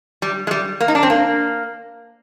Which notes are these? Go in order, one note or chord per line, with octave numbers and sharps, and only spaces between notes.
G3
G#3
G3
A#3
D#4
D4
C4
A#3